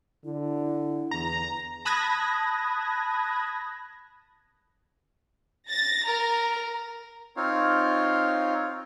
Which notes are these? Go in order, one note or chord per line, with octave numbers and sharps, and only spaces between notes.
D3 E4
E2 A#5
A5 B5 D#6 F#6 G#6 A#6
A6 A#6
A#4 A#5
C4 D#4 F4 C#5 F5